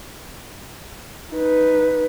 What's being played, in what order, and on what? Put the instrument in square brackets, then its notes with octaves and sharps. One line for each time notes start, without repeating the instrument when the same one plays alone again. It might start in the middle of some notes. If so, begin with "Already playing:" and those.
[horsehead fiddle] D#4 B4